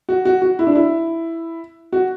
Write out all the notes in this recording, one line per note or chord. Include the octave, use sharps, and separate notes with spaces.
F#4
F#4
F#4
E4
D4
E4
F#4